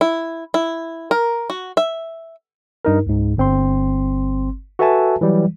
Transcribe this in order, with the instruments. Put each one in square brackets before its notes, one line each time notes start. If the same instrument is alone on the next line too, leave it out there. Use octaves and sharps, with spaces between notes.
[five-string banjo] E4
E4
A#4
F#4
E5
[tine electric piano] G2 D#4 A#4
C#2 G#2
G1 C4 C6
F#4 A4 B4 E5 G#5 A5
E3 F#3 G3